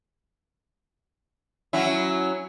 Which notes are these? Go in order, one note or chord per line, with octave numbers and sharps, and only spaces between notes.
F#3 C#4 E4